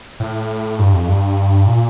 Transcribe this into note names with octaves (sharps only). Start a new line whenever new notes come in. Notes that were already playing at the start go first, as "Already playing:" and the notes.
A2
G2
F2
G2
A#2